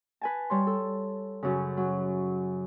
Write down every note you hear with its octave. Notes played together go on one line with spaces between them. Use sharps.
B4 G#5 A5
G3 C#5 C6
A4
F#2 C#3
F#3